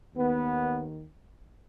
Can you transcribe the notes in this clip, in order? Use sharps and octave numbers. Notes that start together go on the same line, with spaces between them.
D#2 D#3 B3